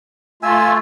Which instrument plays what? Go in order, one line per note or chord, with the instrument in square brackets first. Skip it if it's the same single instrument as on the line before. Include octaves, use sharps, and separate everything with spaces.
[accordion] A3 F4 [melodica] E5 G#5 E6